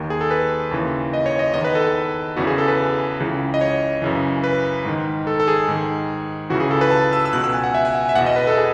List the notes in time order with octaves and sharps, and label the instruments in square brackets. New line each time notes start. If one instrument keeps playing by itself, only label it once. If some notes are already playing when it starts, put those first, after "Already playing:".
Already playing: [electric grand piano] D#2 D#3
G#4
A4
B4
D#2 C#3 E3
D#5
C#5
D#5
E2 D#3 D#5
B4
A4
E2 C#3 E3 F#4
G#4
A4
B4
C#2 C#3 E3
D#5
C#5
F#2 C#3 E3
B4
G#2 D#3
A4
A4
G#4
G#2 D#3
C#2 C#3 E3 F#4
G#4
A4
B4
A5
E6
E6
C#2 B2 F#6
E6
G#5
F#5
E5
G#5
F#5
E5
E2 B2 F#5
D#5
B4
A4
G#4